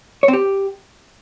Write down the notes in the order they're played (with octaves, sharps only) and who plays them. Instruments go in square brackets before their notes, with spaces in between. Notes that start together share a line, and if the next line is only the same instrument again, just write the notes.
[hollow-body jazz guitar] C#5
C4
G4